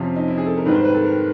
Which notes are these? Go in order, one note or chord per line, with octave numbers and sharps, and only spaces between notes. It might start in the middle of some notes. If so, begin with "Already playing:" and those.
Already playing: F2 C3 F3 C#4
D#4
E4
G#4
A4
A#4
G#2 D#3 G3 B4
C5
B4
A4
A#4